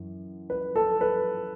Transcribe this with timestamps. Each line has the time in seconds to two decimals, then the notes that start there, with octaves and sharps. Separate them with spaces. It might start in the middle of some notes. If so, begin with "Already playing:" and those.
Already playing: F#2 E3
0.50 B4
0.76 A4
1.01 B4